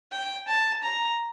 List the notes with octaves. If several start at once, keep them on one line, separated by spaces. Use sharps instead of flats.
G5
A5
A#5